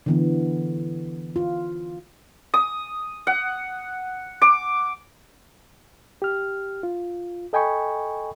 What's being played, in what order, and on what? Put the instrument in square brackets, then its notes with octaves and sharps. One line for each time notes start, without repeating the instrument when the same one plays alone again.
[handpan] D3 E3 B3
F4
[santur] D#6
F#5
D6
[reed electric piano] G4 F6
F4
A4 D#5 G5 G#5 B5 C#6